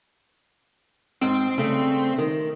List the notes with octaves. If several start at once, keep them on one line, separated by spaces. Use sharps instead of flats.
G#2 C4 G5
G2 C#3 A3
D#3